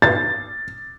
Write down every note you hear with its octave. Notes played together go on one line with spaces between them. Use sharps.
A6